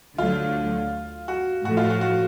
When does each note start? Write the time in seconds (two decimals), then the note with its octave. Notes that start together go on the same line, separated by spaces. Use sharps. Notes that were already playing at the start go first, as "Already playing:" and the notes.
0.18 D2 D3 F#3 A3 F4
1.28 F#4
1.65 A2 F3 A3 F#4
1.77 F4
1.90 F#4
2.01 F#4